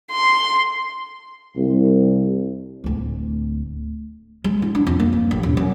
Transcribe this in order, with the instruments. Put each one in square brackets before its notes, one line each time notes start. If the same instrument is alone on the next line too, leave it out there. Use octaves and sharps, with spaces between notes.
[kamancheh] C6
[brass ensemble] C2
[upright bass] D1 D2
G#3
E4
D4
F2
A#3
F3
A1
E1
F#2